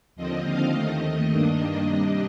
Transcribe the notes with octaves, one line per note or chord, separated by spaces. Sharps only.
D#2 D3 F3 C4 D#5
F5
D#2 D#3 A3 D#5
G2 D#3 A#3 D4
C3 G3 D4 D#5